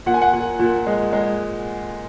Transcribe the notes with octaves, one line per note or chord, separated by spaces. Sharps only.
A#2 F#5
G#5
F#5
A#2
A#2
G#3
G#3